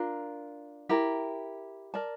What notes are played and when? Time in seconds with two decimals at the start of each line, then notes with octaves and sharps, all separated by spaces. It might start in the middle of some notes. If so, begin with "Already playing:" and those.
Already playing: D4 F4 A#4
0.89 E4 G4 A#4
1.94 A#4 D5 A5